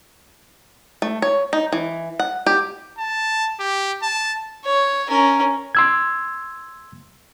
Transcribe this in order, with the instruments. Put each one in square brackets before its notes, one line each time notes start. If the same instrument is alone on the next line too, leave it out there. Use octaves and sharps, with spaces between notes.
[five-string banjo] A3
C#5
D#4
E3
F#5
G4
[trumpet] A5
G4
A5
[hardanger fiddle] C#5
C#4 A#4
[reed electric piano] C6 E6 G#6